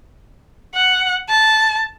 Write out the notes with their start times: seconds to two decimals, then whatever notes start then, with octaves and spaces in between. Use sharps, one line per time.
0.75 F#5
1.29 A5